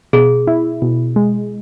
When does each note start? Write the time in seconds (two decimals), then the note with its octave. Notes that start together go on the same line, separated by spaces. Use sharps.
0.13 B2 G#4
0.47 E4
0.82 B2
1.16 G#3